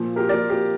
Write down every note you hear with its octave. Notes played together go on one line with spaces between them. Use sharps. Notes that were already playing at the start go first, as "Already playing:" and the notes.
Already playing: A#2 F3
G4 A#4
A#2 F3 A#4 D5
G4 A#4